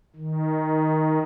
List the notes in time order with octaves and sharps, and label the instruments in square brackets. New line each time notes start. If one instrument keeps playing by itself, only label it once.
[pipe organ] D#3